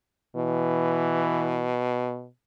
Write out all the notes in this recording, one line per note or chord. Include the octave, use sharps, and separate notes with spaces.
B2 E3